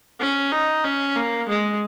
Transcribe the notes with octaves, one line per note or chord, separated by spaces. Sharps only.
C#4
D#4
C#4
A#3
G#3